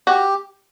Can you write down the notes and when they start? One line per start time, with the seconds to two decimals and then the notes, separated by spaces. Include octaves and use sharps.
0.07 F#4 G4